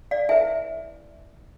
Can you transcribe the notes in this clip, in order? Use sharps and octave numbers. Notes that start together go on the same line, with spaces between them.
D5 F5
E4 B4 E5 G#5